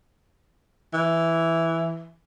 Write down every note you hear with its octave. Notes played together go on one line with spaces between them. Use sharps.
E3